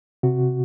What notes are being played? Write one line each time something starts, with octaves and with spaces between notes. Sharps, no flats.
C3 F#4